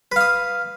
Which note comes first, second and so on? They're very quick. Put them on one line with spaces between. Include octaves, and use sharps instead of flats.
B4 F5 D#6